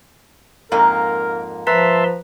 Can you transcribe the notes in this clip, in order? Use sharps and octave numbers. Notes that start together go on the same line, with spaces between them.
F2 G#2 A#3 A#4
F3 B4 E5 A5 A#5 C6 B6